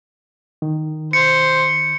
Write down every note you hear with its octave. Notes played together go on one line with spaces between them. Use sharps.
D#3
C5 C#7